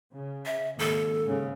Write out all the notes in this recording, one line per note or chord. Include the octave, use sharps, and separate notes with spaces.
C#3
E5
G#1 D#2 A4
G#2 C#3